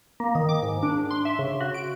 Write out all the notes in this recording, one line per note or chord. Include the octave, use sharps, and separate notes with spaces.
A#3
D#3
D6
G#2
D4
C6
E5
C#3
F#4
D7